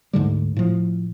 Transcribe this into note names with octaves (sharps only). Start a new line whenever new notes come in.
D2 G#2 D3 G3
A2 F3